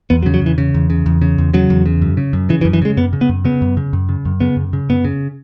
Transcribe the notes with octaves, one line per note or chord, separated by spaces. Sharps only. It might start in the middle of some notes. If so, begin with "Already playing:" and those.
E2 B3
F#3
C#3
F#3
E2 E3
C#3
E2
C#3
E2
C#3
E2
C#3 F#3
E2
C#3
F#2
C#3
F#2
C#3 E3
E3
F#2
E3
C#3 G#3
F#2 B3
C#3
B3
F#2
C#3 B3
F#2
C#3
F#2
C#3
F#2
C#3 B3
F#2
C#3
F#2 B3
C#3